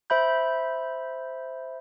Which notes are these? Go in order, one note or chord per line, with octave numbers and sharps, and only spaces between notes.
C5 E5 B5 G6